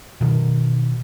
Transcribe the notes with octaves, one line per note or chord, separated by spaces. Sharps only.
B2 D#3